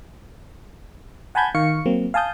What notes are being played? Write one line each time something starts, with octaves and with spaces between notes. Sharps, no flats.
F#5 G#5 A5 B5 G6 G#6
D#3 F5 C#6 C#7
F#3 A#3 C4
F5 G#5 A5 D#6 G6